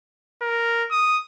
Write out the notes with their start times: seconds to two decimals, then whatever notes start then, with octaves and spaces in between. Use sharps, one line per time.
0.42 A#4
0.91 D#6